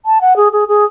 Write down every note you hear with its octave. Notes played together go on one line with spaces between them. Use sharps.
A5
F#5
G#4
G#4
G#4